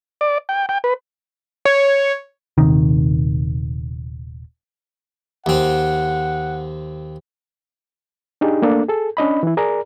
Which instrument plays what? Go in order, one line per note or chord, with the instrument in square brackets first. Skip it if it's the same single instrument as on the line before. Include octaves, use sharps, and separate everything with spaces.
[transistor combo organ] D5
G5
G5
B4
[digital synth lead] C#5
[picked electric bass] D#1 C3 D#3
[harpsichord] D#2 C4 [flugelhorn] F#5
[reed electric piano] D4 D#4 G4 G#4
A3 A#3 D4 A4
G#4 A4
C#4 D4 D#5 B5
E3 E4
G#4 A#4 D5 A#5